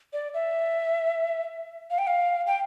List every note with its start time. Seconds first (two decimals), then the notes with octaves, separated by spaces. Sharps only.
0.13 D5
0.34 E5
1.90 F5
1.98 G5
2.07 F5
2.47 G5